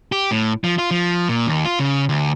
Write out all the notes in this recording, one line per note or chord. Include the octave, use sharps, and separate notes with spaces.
G4
A2
F3
F4
F3
A#2
D#2
F4
C#3
D2